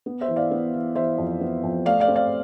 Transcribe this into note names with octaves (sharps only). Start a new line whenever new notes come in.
B3
C5 E5
E3
D5 F5
B3
E3
E3 C5 E5
F2
B3
F2
A3 D5 F5
D5 F5
C4
D5 F5